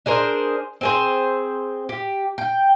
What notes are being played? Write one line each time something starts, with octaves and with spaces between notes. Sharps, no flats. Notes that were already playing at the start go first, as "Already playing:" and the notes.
D4 G#4 A#4 C5
C4 G#4 C5
G4
G5